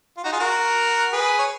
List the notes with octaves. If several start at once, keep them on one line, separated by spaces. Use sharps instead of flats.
F4
D#4 F#4
F4 G#4
F#4 A#4
G#4 B4
C#5